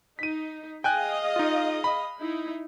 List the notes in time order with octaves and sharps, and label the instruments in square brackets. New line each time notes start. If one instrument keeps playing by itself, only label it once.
[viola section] D#4 [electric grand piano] B6 D#7
[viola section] G#4 D#5 F5 [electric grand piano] G5 G#5 F#6
[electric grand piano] D#4 F4
B5
[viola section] D#4 E4